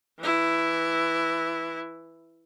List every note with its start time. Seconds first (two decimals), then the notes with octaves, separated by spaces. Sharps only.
0.19 E3 E4